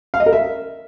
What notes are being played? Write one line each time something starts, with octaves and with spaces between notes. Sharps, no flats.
F5
D#5
A#4
E5